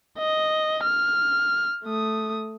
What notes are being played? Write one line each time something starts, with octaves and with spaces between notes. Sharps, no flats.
D#5
F6
A3 D#6